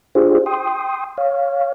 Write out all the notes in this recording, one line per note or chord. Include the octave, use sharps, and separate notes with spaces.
D4 F4 G4 G#4 C5
G5 C6 D#6
C#5 F5